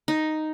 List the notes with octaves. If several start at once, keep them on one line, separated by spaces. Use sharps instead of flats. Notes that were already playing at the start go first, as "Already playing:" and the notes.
D#4